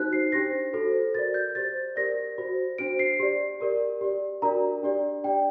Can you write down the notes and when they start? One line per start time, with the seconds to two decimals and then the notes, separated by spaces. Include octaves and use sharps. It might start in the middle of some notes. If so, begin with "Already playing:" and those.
Already playing: D#4 F#4 C5 F#6
0.13 C7
0.32 D4 G4 C5 A#6
0.73 F#4 A4 C5
1.15 F#4 A#4 D5 A6
1.34 G6
1.55 G4 C5 A6
1.96 G4 A#4 D5 A#6
2.38 F#4 C5
2.78 D4 F#4 C5 D7
2.99 C7
3.20 G4 D5
3.61 G4 A#4 D5
4.01 G4 D5
4.42 D4 F#4 A#4 D5 A#5
4.83 D4 G4 D5
5.24 D4 G4 D5 G5